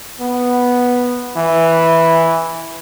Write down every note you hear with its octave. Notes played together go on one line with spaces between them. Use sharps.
B3
E3